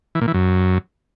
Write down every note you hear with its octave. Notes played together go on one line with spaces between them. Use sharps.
E3
A#2
E3
F#2